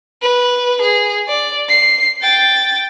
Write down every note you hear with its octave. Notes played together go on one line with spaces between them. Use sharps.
B4
G#4
D5
C7
G5 A6